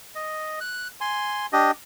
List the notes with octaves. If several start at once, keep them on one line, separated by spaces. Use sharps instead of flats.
D#5
F#6
G#5 C6
D4 G4 D#5